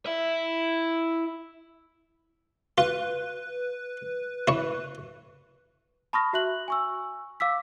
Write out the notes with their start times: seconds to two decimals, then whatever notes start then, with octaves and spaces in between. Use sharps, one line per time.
0.06 E4 E5
2.78 F4 B4
4.48 E4 C#5
6.13 A5 B5 C#6 D#6 F6 A#6
6.33 F#4 E5 F#6 F#7
6.68 G#5 C#6 E6
7.40 F5 D6 E6 B6